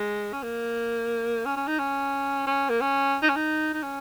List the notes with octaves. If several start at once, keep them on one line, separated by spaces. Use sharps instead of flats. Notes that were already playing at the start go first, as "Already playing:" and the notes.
Already playing: G#3
C#4
A#3
C#4
C#4
D#4
C#4
C#4
A#3
C#4
D#4
C#4
D#4
D#4
C#4